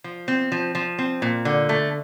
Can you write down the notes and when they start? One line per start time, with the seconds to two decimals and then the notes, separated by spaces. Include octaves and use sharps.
0.04 F3
0.28 C4
0.52 F3
0.75 F3
0.98 C4
1.22 A#2
1.45 D3
1.69 A3